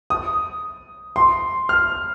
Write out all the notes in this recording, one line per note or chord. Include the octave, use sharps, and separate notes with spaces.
D#6
C6
F6